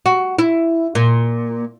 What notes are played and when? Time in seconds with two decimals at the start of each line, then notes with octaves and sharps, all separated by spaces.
0.06 F#4
0.39 E4
0.95 A#2